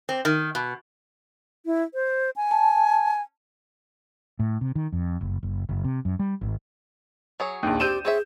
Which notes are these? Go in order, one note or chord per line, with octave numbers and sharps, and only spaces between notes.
C4
D#3
B2
E4
C5
G#5
A5
A2
C3
D#3
F2
F#1
F#1
F#1
C3
F#2
G3
G#1
F#3 G#4 C#5
A#1 D#2
C4 G4 D5 G6 D#7 E7
C4 G#4 C#5 E5